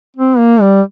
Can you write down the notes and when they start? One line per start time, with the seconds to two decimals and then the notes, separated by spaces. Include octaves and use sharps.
0.17 C4
0.38 A#3
0.61 G3